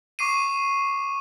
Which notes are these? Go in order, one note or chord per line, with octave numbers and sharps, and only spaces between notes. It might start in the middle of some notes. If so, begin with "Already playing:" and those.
C#6 D6 C7 D#7